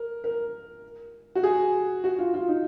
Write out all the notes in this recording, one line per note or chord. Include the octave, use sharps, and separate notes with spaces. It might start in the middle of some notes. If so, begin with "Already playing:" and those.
Already playing: A#4
A#4
F#4
G#4
F#4
F4
F4
D#4